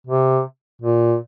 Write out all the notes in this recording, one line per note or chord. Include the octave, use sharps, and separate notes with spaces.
C3
A#2